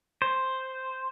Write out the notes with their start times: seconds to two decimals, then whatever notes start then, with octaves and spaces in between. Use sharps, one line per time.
0.22 C5